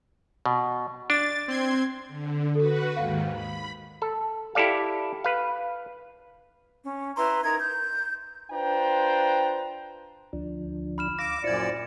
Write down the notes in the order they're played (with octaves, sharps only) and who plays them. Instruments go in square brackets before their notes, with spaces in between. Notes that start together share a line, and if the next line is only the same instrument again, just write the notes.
[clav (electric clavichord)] B2
[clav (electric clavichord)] D4 [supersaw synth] A6
[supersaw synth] C4 C6 G#6
[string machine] D3
[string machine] F#4 B4 [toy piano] A4
[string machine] D#2 G#2 D#3 [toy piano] F5 F#5
[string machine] B5
[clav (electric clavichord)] A4
E4 G4 A4 D5 F5
B4 F5
[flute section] C#4
E4 B4 A#5 C6
D#4 A#4 A#5 G#6
G6
[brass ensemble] D4 F4 B4 C5 G5 A#5
[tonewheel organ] D2 F3 D4
[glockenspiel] B5 F6 E7
[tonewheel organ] F5 E6 [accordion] D6 [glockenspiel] A#6
[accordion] F#2 A#2 D5 [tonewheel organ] E4 F4 C5 [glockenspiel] G#6 C#7